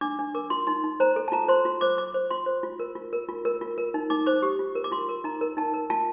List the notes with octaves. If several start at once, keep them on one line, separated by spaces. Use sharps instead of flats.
D4 D6
D4
A#4 D6
F4 C6
D#4 C6
D#4
C5 A#5
A4
A5
F4 A#5
C5 C6
F4 C6
C5 D6
F4 D6
C5
F4 C6
C5
F4
A#4
F4
A#4
F4
A#4
F4
A#4
D#4
D#4 D6
C5 D6
G4 D#6
F4
A#4
D6
F4 C6
A#4
D#4 A#5
A#4
D#4 A5
A#4
F4 A5